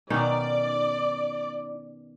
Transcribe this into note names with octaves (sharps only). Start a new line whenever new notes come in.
B2 D#3 C#4 D#4 D5